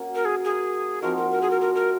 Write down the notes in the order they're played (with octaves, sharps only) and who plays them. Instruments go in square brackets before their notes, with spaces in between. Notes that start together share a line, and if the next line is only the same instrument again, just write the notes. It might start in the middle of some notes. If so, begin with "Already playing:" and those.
Already playing: [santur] A#3 C#4 F#4
[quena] A#4
G#4
G#4
[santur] F3 C4 D#4 F#4 [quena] A#4
[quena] A#4
A#4
G#4
A#4
A#4
A#4